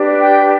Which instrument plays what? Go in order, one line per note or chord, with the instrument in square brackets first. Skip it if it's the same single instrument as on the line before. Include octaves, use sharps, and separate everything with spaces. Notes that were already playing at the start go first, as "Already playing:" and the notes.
Already playing: [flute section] D4 G4 B4
G5